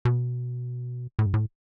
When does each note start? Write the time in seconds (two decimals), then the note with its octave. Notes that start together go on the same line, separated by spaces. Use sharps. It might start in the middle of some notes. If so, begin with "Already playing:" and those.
0.05 B2
1.19 A2
1.26 G2
1.34 A2